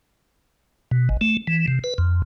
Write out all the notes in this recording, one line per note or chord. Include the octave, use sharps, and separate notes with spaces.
B2
G#1
A3
E3
C3
B4
F2